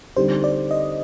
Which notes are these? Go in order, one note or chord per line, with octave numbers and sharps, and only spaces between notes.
D3 G3 C4 D#4 G4 C5
D5
D#5